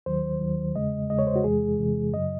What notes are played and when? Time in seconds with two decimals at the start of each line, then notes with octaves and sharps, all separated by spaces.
0.06 D#2 D#3 F#3 C5
0.41 D#2 D#3 F#3
0.75 E2 C#3 G#3 D#5
1.10 E2 C#3 G#3 D#5
1.19 C#5
1.27 C5
1.36 F#4
1.44 E2 C3 E3 G#3 G#4
1.79 E2 C3 E3 G#3
2.13 F#2 C#3 F#3 D#5